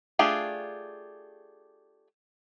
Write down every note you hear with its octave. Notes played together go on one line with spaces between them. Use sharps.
A3 D4 F4 G4 G#4